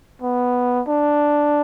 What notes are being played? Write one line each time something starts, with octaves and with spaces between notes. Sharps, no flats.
B3
D4